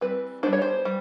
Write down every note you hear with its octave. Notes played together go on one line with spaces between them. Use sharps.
E3 G3 C4 B4
G3 B3 D4 C5
C#5
C5
G3